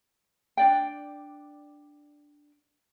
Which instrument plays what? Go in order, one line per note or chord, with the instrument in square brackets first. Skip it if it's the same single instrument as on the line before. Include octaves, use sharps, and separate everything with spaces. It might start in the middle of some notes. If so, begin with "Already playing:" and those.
[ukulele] D4 D5 G5